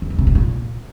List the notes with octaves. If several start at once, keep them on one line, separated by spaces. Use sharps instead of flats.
E2
G2
C3
B2
A#2